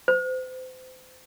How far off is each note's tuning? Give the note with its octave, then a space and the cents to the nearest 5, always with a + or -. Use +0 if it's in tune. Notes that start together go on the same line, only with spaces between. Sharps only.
C5 -30